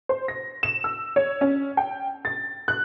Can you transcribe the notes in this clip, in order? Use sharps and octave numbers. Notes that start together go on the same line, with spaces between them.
C5
A#6
E7
E6
C#5
C#4
G5
A6
F#6